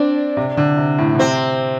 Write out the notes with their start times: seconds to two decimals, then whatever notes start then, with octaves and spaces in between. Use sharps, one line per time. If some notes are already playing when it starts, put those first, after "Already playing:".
Already playing: C4 D4
0.37 C3
0.57 D3
0.77 C3
0.98 A2
1.15 D3
1.19 C3 C4